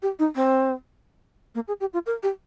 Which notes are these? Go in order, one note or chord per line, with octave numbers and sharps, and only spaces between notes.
G4
D#4
C4
A#3
G#4
G4
F4
A#4
G4